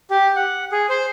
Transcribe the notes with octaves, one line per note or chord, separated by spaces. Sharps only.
G4
F#5
G#4
C5